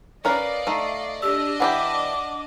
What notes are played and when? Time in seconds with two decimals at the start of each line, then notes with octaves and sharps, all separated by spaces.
0.25 C#4 A#4 B4 D5 D#5 F5
0.67 A3 D#4
1.22 D4 G4 D#5 E6
1.60 E3 E4 G4 F#5 D6